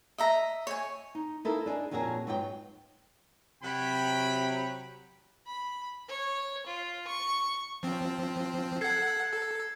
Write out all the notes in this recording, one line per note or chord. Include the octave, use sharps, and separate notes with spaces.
D#5 E5 A#5
C#5 G#5
D#4
D#4 E4 A4 A#4 F5
D4 D#4 G#4
F2 A#2 C#4 F#4 G#4 A#4
G#2 F#3 B3 D#4 F4 G5
C3 F#3 G5 B5
B5
C#5
F4
C#6
F3 C4
A4 F#5 G#6 C7
A4